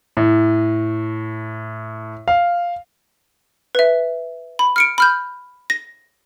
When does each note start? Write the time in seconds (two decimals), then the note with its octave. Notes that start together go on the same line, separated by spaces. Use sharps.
0.17 A2
2.28 F5
3.75 B4 E5
4.59 B5
4.76 F6 C#7 D7
4.98 B5 F6 G6
5.70 A#6